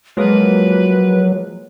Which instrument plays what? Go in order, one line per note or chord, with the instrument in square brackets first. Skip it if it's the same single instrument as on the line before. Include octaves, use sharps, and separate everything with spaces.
[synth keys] F3 G#3 A#3 [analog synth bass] F#3 [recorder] B4